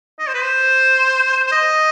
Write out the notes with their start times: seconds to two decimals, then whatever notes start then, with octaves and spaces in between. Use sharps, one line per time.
0.19 D#5
0.27 C5
0.34 B4
0.43 C5
1.47 C5
1.52 D#5